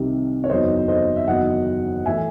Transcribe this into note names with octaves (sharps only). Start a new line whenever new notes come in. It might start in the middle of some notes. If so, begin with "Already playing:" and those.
Already playing: C2 C3 D#3
C#5
F#1 E2 D#3 F#3 C5 D#5
C5 D#5
E5
F#1 E2 D#3 F#3 D#5 F#5
A2 E3 E5 G#5